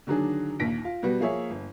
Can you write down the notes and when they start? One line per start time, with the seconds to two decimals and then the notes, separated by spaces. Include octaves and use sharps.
0.07 D3 D#3 F#3 D4 G#4
0.59 A#1 D#2 A#6 B6 D7
0.85 F4
1.02 B2 G3 B3 F#4
1.20 F3 A#3 G#4 C#5 E5
1.50 G1